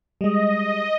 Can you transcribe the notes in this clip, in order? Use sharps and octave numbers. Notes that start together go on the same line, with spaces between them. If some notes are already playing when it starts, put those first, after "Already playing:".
G3 G#3 D#5